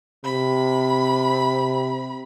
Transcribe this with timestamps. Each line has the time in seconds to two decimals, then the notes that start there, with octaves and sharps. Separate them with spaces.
0.25 C3 B5